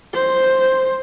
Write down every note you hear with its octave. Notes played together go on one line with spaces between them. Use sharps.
C5